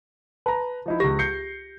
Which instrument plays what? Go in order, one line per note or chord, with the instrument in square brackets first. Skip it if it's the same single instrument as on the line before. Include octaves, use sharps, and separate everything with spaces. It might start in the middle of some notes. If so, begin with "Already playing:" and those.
[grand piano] B4 A#5 [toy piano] A5
[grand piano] F3 D#4 E4
[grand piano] C#2 A#6 [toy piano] G4
[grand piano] G6 C7 C#7